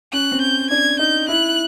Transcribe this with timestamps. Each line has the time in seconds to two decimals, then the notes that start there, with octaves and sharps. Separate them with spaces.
0.13 C#4 F#6
0.32 C4
0.41 G6
0.70 D4 G#6
0.99 D#4 G6
1.28 E4 F#6